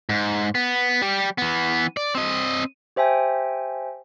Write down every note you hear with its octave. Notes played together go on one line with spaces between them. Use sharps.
G#2
B3
G3 G4
E3 B3
D5
C4 D#5
G4 C5 E5 G5 G#5